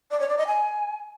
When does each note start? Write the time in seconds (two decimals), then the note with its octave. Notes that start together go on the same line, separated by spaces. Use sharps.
0.11 D5
0.20 C#5
0.29 D5
0.38 D#5
0.47 G#5